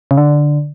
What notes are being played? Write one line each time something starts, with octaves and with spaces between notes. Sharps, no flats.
C#3
D3